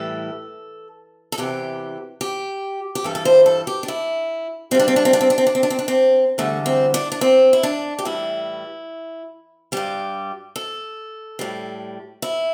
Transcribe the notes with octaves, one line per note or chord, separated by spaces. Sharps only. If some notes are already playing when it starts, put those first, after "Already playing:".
Already playing: A2 E3 G3 A4
A4
E2 C3 E3 G4
G4
G4
G2 E3 G3 A4
A4
C5
A4
G4
D4
E4
G2 G3 C4 D4
C4
D4
C4
D4
C4
D4
C4
D4
C4
D4
C4
D4
C4
E2 D3 G3 A3
C4
D4
D4
C4
E4
D4
G4
A2 E3 G3 E4
G2 G3 G4
A4
A2 G3
E4